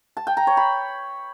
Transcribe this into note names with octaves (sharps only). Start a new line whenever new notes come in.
A5
G5
A#5
C#5
B5